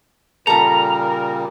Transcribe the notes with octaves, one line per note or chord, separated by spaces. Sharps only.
A#2 C#3 G3 A4 A#4 A#5 B5